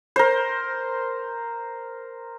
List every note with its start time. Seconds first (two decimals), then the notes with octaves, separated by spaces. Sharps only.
0.16 A#4 C5